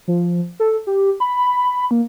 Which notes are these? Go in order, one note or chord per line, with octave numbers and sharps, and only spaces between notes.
F3
A4
G4
B5
A#3